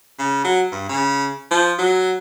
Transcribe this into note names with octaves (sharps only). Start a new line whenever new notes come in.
C#3
F#3
G2
C#3
F3
F#3